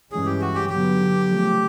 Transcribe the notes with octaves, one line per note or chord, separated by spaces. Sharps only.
G2 E3 G#3 C#4 G#4
G4
F#4
G4
D3 F#3 B3 G4
C#3 F3 A3